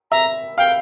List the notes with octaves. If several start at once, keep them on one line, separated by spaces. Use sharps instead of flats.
E5 A#5
F5 G5